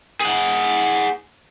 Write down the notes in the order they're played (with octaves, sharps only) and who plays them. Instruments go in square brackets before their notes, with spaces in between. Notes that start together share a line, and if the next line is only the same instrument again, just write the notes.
[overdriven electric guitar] G#4 F#5